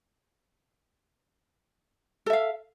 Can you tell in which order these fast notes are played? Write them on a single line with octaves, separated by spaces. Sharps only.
A4 E5 F5